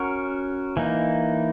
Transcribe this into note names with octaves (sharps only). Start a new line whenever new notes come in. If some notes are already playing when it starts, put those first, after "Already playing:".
Already playing: C#4 F#4 A#4
E3 A#3 D#4